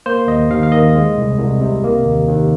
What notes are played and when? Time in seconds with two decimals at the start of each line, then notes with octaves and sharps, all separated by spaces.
0.06 A#3 C5
0.27 D#2 D#5
0.50 D#2 F5
0.63 F5
0.72 D#3 D#5
0.95 G#3
1.17 C2
1.39 C2
1.61 C3
1.84 A#3
2.05 D#2
2.28 D#2